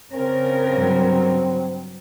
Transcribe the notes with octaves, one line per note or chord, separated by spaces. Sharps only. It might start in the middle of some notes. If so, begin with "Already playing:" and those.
C#3 C4 A#4
G2 F#3